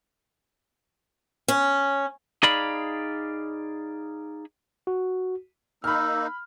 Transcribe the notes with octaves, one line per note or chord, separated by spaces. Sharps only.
C#4
D#4 G#4 D5 F5 B5
F#4
A#3 D#4 B5 E6 F6